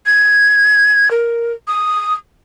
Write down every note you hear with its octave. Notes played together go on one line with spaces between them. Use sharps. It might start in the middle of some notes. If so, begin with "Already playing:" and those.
G#6
A#4
D#6